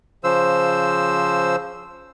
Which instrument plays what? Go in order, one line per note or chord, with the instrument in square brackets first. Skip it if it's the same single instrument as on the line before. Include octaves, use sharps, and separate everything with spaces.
[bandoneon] C#3 F3 C5 E6